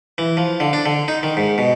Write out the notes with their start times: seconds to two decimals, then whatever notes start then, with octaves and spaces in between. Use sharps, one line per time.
0.18 E3
0.37 F3
0.60 D3
0.73 D4
0.86 D3
1.08 D#4
1.23 D#3
1.37 G#2
1.58 B2